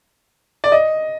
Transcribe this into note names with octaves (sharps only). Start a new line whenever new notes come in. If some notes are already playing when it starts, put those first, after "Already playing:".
D5
D#5